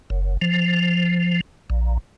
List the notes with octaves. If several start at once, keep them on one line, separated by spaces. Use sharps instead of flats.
F#1
F3
A#1